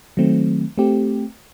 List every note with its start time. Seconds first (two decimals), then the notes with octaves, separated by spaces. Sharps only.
0.17 D#3 F#3 A3 C4
0.78 A3 C4 G4